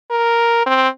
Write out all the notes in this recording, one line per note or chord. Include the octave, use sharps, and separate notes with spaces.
A#4
C4